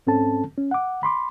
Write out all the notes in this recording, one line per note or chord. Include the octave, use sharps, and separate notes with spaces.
G#2 C4 C#4 A4 A5
C#4
F#5 D6
B5 C6 D6